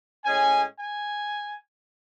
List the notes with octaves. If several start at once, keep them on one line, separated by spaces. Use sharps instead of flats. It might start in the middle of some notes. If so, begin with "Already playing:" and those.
A2 G#3 C#4 G#5
G#5